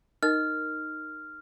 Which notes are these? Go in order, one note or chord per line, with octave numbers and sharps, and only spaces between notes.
D#4 A#4 D#5 F6